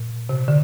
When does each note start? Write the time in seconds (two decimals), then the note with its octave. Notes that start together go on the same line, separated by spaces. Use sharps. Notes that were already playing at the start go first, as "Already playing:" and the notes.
Already playing: A#2
0.29 C3
0.48 D3